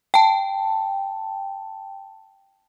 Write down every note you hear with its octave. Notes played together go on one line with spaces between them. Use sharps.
G5 A5